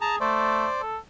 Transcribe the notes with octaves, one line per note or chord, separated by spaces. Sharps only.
G#4 A5 A#5
A3 C5 D5
A4